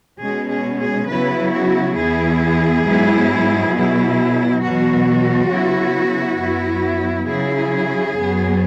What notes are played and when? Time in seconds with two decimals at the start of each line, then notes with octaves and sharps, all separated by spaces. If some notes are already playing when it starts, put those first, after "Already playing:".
0.21 B2 G#3 C#4 G#4
0.51 G#4
0.80 G#4
1.09 C#3 F#3 B3 E4 B4
1.53 F#4
1.98 E2 E3 B3 E4 G#4
2.86 G#2 F#3 B3 E4
3.75 B2 F#3 E4
4.63 E2 B2 F#3 F#4
5.51 C#3 F#3 B3 E4
6.39 F#2 F#3 B3 E4
7.28 C#3 F#3 E4 G#4
8.16 F#2 F#3 B3